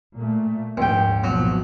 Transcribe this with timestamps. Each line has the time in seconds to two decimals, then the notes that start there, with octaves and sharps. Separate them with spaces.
0.16 A#2 A3
0.77 A#1 D#2 G#2 G5
1.24 G#1 B2 F3 F#3